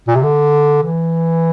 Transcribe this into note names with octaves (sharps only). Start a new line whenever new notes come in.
A#2
C3
D3
E3